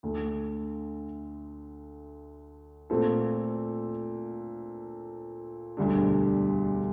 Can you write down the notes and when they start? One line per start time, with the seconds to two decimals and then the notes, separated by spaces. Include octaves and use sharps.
0.03 D2 D3 A3
2.90 A#2 A3 C4 F4 A4
5.77 E1 D2 D3 G3 D4